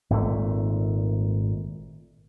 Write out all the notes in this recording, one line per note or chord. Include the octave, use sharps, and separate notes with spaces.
G#1 A#2 C#3 A3